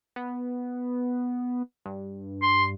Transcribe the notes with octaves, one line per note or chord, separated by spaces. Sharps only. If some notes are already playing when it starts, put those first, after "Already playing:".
B3
G2
C6